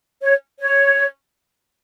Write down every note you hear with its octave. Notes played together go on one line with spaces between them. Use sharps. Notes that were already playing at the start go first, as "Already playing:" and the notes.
C#5
C#5